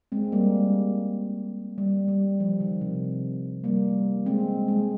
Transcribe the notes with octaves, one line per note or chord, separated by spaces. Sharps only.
G#3 C4
G3 A#3
G3
G3
F3
D#3
C3
G3 A#3
G#3 C4
G#3